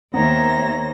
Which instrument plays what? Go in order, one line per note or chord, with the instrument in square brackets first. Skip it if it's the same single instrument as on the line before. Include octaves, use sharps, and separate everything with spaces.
[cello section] D#2 E5 [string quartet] D#3 C5 A#6 [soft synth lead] B3 [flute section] C#5 A#5